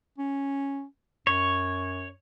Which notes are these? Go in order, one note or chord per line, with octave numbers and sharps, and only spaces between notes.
C#4
F#2 C#5